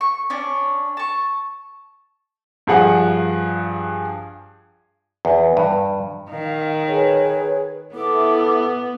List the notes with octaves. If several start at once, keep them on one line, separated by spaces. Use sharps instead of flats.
C#6
C#4 D4 C#5
A5 C#6
G2 F3 G#4 F#5
E2
G2
D#3 F5
G#4 B4 C#5
B3 E4 A4 D6